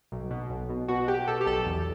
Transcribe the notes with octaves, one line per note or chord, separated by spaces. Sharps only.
B1
B2
B1
B2
B2 F#4
B2 G4
B2 A4
G4
B1 A4
E2